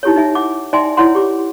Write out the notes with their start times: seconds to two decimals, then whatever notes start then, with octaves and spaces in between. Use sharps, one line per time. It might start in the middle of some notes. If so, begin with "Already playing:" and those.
0.03 D#4 E4 G4 A4 C#5
0.16 D#4 E5 G#5
0.35 F#5 D6
0.73 D#4 D5 E5 G5 G#5 C6
0.97 E4 C#5 D5 F#5 C6
1.15 G4 D6